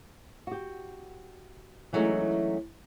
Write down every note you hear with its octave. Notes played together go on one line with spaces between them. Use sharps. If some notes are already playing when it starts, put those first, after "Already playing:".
F#4 G4
E3 F#3 G#3 A3 C#4 D#4